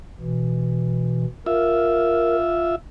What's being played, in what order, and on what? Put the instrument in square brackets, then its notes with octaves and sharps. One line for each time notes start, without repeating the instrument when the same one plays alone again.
[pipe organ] B2 E3
[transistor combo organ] F4 E5 [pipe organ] A#4